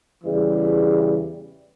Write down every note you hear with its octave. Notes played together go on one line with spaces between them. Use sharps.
E2 C#3 E3 G3